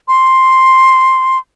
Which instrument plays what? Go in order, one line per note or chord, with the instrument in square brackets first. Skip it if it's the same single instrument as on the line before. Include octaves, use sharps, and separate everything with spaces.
[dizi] C6